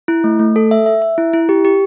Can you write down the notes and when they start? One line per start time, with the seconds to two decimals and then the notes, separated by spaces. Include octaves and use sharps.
0.08 E4
0.24 A3
0.39 A3
0.56 A4
0.71 E5
0.86 E5
1.02 E5
1.18 E4
1.33 E4
1.49 G4
1.65 G4